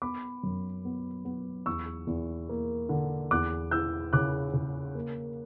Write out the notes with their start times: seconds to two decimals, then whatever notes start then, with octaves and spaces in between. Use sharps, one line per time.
0.02 B3 B5 D6
0.43 F#2
0.85 B3
1.25 B3
1.66 E2 C#6 E6
2.07 E2
2.49 A#3
2.89 D3
3.31 E2 D6 F#6
3.71 E3 E6 G6
4.13 C#3 D6 F#6
4.53 C#3
4.95 A#3